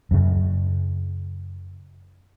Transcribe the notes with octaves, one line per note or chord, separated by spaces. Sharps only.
F#2 C#3